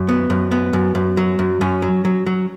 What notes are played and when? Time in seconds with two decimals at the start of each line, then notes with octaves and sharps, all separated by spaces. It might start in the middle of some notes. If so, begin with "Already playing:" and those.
Already playing: F#2
0.09 B3
0.30 F#2
0.51 B3
0.73 F#2
0.95 F#2
1.17 F#3
1.39 F#2
1.61 F#2 C#4
1.82 F#3
2.05 F#3
2.26 F#3